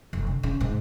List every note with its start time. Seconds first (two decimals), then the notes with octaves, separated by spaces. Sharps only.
0.13 F1
0.27 D3
0.43 C#3
0.61 G#2